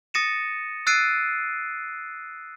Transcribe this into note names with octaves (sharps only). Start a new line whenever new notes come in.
D#6 A6 A#6 C#7 D#7 E7
E6 F#6 A6 C7 D7 D#7